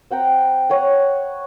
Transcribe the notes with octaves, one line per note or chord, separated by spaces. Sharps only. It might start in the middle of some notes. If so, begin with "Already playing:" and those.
C4 F#5 G5 A#5
C#5 F#5 G#5